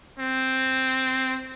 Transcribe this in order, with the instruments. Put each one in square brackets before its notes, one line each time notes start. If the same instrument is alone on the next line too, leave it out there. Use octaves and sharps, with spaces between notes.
[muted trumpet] C4